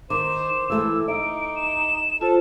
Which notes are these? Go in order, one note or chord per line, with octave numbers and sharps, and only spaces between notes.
D#3 C5 D6 E7
E3 A3 E6
D#4 E5 D7
E7
F4 A4 C5 A5